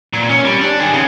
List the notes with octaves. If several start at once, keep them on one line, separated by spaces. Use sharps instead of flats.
A#2
C#4
G3
D4
D#3 G#4
C#3